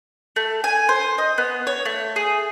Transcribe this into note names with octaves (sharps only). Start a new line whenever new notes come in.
A3
G#5
C5
D#5
B3
C#5
A3
G#4